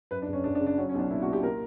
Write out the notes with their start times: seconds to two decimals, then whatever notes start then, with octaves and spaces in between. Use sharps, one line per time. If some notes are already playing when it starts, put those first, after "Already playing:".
0.11 F#2 B4
0.22 D4
0.27 F#1
0.33 C#4
0.44 F#1 D4
0.55 D4
0.60 C#3
0.66 D4
0.78 F#3 C#4
0.89 C#4
0.94 B1 D4
1.10 A#2 E4
1.22 F#4
1.27 A#2
1.33 G4
1.43 A#2 A#4